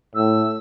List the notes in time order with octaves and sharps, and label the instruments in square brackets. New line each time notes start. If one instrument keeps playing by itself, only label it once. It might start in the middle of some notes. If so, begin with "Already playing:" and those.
[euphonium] A2 [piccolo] E6